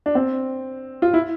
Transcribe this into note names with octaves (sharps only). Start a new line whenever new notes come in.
D4
C4
F4
E4